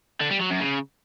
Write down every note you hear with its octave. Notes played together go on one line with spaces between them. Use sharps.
D3
G3
F#3
F#2
C#3